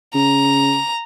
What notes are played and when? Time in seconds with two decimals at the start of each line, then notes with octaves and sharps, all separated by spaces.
0.15 C#3 A#5